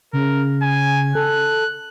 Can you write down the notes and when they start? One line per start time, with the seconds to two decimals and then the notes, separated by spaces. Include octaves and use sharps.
0.13 C#3 A#4
0.62 G#5
1.15 A4 F#6